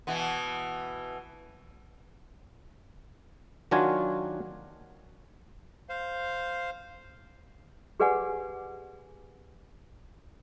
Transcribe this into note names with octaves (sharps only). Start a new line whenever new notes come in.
B2 E3 B3
D#3 F#3 D4 F4 F#4 G#5
C5 F5
G4 G#4 B4 D5 F#5 G#5